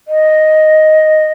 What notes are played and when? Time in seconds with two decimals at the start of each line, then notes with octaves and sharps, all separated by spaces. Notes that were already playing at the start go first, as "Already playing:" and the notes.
0.08 D#5